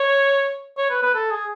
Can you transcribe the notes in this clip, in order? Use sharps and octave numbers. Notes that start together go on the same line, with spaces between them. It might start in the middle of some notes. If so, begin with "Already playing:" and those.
Already playing: C#5
C#5
B4
B4
A4
G#4